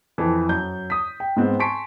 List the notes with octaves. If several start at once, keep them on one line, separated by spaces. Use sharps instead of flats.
F2 E3
F#2 G6
D#6 B6
G5
G#2 B3 C4
G#5 A5 C6 C#6 B6 D7